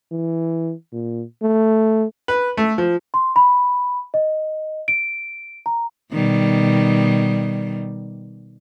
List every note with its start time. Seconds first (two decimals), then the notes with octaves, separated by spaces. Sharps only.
0.12 E3
0.92 A#2
1.42 A3
2.28 B4
2.57 A3
2.78 F3
3.14 C6
3.36 B5
4.14 D#5
4.88 D7
5.66 A#5
6.13 B2 D#3 G3